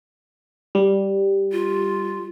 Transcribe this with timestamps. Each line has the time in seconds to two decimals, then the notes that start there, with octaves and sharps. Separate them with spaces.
0.75 G3
1.52 F4